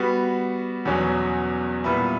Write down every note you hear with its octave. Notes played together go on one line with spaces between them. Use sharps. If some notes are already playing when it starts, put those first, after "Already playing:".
Already playing: G3 B3 F#4
E2 B2 F#3 C#4
A#2 G3 B3 E4 B4